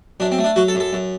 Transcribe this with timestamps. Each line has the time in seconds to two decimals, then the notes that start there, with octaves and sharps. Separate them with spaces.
0.20 F#2 D4
0.32 C4
0.38 A3
0.44 D4
0.56 F#3 F#4
0.68 A4
0.75 F#2
0.80 A4
0.93 F#2